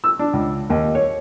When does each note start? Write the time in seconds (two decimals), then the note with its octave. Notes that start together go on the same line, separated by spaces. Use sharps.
0.04 E6
0.19 D4
0.33 C#2
0.70 D#2
0.95 C#5